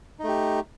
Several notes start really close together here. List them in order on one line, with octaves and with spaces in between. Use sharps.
D#4 A3 G4